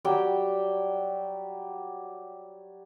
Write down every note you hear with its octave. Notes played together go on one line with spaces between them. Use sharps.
F#3 G3 G4 G5